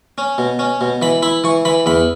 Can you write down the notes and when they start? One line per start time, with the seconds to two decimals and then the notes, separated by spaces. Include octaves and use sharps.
0.18 C#4
0.38 B2
0.59 C#4
0.81 B2
1.02 E3 B5
1.23 E4 B5
1.44 E3 C#6
1.65 E3 B5
1.86 E2 B5